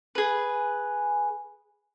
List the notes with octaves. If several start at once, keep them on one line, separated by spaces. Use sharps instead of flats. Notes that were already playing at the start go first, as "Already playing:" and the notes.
G#4 B4